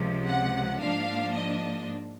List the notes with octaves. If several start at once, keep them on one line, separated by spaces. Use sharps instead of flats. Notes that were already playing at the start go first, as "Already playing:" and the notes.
Already playing: C#2 C3 F3
F#5
G#2 F3 A#3 D4 F5
D#5